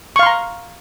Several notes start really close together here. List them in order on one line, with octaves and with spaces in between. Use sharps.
C#6 F5 C6 A#5